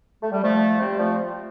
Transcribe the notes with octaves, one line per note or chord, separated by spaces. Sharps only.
A3
G3
F3 A3
G3 C4
F3 A3